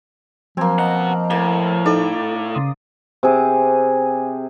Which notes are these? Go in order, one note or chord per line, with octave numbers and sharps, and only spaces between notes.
F3 F#3 A#3 C4 G#6
B2 D#5 F#5 A#5
A2 A#3
D#4 A4 D5
C#3 C6 D#6
C3 G#4